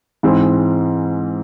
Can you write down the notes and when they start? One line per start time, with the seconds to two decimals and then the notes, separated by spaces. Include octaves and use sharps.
0.23 G#2 E3 G#3 C4